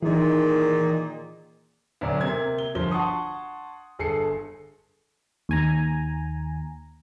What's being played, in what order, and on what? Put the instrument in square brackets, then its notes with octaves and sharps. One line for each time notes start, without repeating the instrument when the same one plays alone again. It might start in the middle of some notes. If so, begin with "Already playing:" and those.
[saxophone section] A#2 D#3 G#4 [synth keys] E3 D#4
[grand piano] D2 B2 F#3 D5
C3 A#3 G#6
G7
G1 F3 G7
F#5 A5 C6 C#6 D#6
G1 G#4 A4 C7 C#7
[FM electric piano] D#2 G#5 A#5